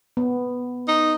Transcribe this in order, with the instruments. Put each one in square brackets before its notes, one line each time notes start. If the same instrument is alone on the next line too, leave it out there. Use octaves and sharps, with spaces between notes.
[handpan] B3
[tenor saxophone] D#4